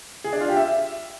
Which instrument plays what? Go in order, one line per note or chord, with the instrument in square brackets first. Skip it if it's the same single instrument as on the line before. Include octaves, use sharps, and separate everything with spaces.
[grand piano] G#4
D4
F4
G4
E5